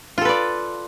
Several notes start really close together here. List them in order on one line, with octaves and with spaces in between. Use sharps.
F4 A4 B4 D5